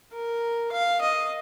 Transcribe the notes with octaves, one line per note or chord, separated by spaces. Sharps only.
A#4
F5
D#5